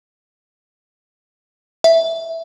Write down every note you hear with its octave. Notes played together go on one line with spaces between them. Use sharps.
E5